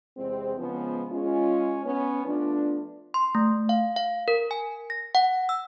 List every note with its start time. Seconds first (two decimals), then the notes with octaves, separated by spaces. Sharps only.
0.18 E2 C3 G#3 C4
0.58 C#3 F3 G#3 B3
1.11 G#3 C#4 F4
1.85 B3 C#4
2.25 F3 A3 B3 D4
3.14 C6
3.35 A3
3.69 F5
3.96 F5
4.28 A#4
4.51 G#5
4.90 A#6
5.15 F#5
5.49 E6